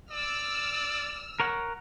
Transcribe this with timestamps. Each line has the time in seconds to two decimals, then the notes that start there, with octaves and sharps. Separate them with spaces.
0.11 D5 E6 F6
1.40 A#4 C#5 F#5